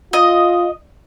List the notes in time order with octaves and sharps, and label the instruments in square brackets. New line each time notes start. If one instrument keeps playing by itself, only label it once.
[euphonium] F4 [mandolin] D#5